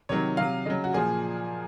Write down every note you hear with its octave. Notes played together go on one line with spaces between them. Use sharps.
C3 D#3 F#3 C#5
C3 F#3 F5
C#3 F#3 D#5
F#4
A#2 F3 G#4